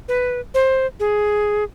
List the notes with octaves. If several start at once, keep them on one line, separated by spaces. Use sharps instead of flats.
B4
C5
G#4